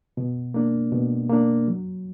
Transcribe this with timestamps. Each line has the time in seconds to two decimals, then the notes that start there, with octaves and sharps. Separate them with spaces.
0.17 B2
0.54 A#3 D4
0.92 B2
1.30 A#3 D4
1.68 F#3